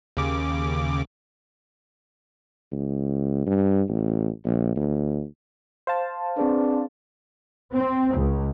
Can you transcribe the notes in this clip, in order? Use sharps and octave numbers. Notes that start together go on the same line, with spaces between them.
D#2 C#3 D6
C#2
G2
A1
A#1
D2
C5 F5 A5
C4 D4 G#4 B4
C4
C#2